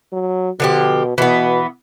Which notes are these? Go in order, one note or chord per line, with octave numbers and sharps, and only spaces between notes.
F#3
B2 D3 F3 G4
B2 E3 B3